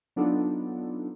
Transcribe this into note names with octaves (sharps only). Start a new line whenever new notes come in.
F#3 B3 D4 D#4 F4 A4